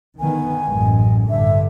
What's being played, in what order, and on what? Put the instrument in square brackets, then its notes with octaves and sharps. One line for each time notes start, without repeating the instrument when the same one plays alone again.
[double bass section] D3 D#3 B3 [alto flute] G#5
[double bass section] A1 F#2 G#3
[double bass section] A1 G2 D3 [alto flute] E5